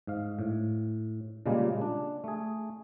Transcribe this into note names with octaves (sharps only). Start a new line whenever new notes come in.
G#2 F5
A2
A#2 C#3 G3 G#3 A#3
D4
A3 G#4